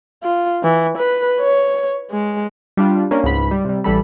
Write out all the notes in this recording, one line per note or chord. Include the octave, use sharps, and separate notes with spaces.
F4
E3
B4
C#5
G#3
G3 D4 F4
A#3 C#4 D4
C#2 G#2 B5 B6
G3
C3 G3
A1 E3 G3 A4 B5